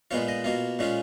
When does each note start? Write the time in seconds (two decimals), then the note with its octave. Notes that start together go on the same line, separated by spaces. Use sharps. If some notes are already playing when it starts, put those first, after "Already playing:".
0.11 A#2 G#3 B3 F4 C#5
0.28 D#5
0.44 B2 A#3 F4
0.79 A#2 G#3 C#4 F4